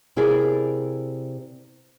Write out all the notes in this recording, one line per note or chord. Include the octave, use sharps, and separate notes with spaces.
C3 E4 G#4 A#4 D5